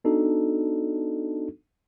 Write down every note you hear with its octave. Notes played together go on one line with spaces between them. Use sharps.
B3 D4 D#4 F#4 A4